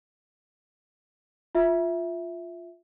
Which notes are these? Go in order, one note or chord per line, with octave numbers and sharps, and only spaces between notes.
F4 E5